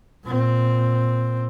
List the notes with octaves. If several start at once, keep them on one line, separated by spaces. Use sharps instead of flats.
A#2 C4